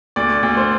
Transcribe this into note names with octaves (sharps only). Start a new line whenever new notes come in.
D2 D5
D2
C5